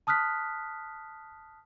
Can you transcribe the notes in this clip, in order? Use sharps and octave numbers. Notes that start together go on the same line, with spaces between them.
A5 D#6 F6 F#6 B6